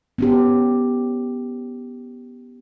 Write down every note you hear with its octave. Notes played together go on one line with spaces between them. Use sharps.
B3 C#4 G4